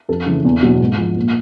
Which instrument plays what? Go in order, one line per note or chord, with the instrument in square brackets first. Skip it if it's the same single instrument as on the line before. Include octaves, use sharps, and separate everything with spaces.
[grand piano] F2 A4
C#3 E3
E2
B2 F#3
G#2
F3
A#2